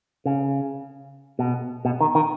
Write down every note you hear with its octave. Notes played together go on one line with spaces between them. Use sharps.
C#3
B2
B2
D#3
D#3